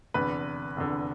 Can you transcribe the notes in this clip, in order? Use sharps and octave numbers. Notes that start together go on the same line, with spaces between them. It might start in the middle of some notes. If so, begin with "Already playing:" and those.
F1 E2 D3 B4
F1 E2 D3